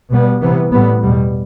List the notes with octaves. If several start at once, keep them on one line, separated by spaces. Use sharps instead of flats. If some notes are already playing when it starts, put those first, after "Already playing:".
B2 G3 B3
C3 E3 B3
A2 G3 B3
E2 B2 G3